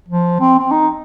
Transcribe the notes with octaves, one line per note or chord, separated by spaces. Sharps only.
F3
C4
C4
D#4